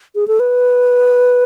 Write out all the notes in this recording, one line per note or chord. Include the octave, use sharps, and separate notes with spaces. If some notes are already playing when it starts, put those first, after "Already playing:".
G#4
A4
B4